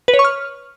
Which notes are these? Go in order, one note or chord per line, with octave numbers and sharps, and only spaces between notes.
B4
C#5
C#6
F6